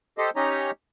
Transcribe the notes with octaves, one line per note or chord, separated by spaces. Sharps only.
G4 A4 C5 D#5
C#4 D#4 G4 C#5 D#5 A#5